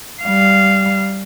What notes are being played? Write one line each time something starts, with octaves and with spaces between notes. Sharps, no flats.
G3 F5